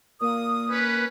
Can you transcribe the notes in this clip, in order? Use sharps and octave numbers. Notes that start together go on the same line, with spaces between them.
A#2 A#3 A#4 D#6
C#4 B4